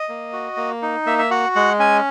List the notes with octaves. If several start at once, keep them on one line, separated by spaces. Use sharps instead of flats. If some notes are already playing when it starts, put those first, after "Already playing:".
Already playing: D#5
A#3
F#4
A#3
D#4
A#3 E5
E5
F#4 F#5
G#3 F#5
C#4 G#5